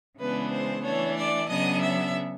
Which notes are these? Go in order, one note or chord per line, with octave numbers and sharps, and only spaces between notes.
C#3 E3 G#3 B3 D4 B4
C5
E3 A3 D4 C#5
D5
C#3 F#3 B3 D4 D#5
E5